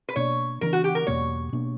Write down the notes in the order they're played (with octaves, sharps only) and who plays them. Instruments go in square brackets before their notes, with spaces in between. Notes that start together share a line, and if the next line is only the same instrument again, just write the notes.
[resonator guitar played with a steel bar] B4
[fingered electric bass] B2 A#3 D4 [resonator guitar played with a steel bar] C#5
[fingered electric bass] C#3 E3 B3 D4 [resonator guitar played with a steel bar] A#4
[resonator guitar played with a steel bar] F#4
G4
A#4
[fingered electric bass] E2 B2 A#3 [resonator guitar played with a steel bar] C#5
[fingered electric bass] B2 A#3 D4